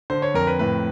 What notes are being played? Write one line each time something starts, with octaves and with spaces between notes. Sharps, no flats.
D3 C5
C#5
F2 A#4
B4
A2 B4